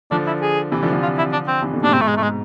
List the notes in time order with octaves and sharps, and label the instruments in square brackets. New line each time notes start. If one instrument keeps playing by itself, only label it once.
[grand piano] D3 F3 [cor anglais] D4
[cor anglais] E4
G#4
[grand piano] C3 E3
D3 F3
D3 F3
[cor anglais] F4
E4
D4
C4
[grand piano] C3 E3
B2 D3
[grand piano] A2 C3 [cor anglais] D4
[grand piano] G#2 B2 [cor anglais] C4
[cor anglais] A3
G#3
[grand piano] G#2 [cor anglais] A3
[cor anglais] G#3